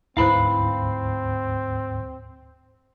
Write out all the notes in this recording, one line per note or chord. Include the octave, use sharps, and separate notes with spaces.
D2 G#2 C4 E4 B4 C5 F5 B5